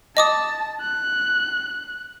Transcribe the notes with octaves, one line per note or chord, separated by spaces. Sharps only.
D#5 A5 D6 D#6
F#6